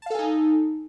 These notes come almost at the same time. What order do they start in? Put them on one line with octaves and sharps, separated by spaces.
A5 F5 A4 G#5 D#4